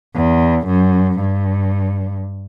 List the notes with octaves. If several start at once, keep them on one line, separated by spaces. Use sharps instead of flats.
E2
F#2
G2